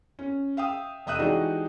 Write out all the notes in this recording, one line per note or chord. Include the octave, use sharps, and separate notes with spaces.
C#4
E5 F5 G5 D#6
F1 D#5 E5 D#6 F#6 D#7
E3 G#3 D4 D#4 F#4 G4